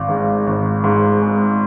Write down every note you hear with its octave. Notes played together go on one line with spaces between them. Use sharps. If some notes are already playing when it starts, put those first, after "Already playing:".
Already playing: G#1 F5
G#2
G#1
G#2
G#3